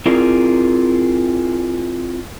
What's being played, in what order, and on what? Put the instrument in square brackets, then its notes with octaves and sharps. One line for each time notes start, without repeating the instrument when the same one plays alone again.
[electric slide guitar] C4 E4 F4 G#4 A#4 D5